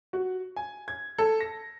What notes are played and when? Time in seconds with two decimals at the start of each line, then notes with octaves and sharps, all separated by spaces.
0.13 F#4
0.56 G#5
0.88 G#6
1.18 A4
1.41 A#6